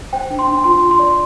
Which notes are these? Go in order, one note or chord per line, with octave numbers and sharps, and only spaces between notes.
C5 G5
D4
C6
D4
F4 C6
F4
C6
D5